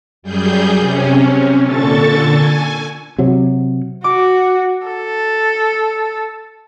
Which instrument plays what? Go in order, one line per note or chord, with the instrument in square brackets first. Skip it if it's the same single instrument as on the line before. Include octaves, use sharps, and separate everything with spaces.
[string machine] F#2 G3 G#4 G6
C3 C#4
A#2 D3 A4 C#6 A6
G#5
[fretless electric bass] C3 F#3
[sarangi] F#4 [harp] D6
[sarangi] A4